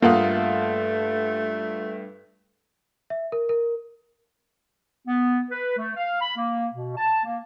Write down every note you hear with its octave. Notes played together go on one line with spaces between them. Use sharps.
G2 A3 A#3 F4 A4 F5 F#5 D#6
E5
A#4
A#4
B3
B4
A3
F5
B5
A#3
B2
A5
A#3